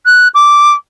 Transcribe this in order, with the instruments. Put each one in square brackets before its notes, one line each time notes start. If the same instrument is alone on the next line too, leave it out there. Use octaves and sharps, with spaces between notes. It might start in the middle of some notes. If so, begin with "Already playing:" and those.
[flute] F#6
D6